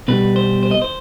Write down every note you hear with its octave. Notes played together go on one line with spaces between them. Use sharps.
B2 G3 B4
C5
C5
D#5
C5